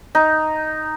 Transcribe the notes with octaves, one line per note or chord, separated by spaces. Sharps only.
D#4